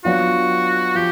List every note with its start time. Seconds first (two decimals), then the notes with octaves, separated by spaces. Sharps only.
0.04 F#3 B3 D4 F4 F#4
0.95 F3 G4